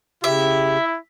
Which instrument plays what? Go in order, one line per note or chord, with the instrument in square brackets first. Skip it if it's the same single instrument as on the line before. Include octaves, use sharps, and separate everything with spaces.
[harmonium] C#3 G4 [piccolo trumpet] E4 [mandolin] E5